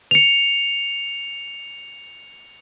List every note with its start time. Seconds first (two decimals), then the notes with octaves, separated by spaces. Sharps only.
0.11 C#7 F7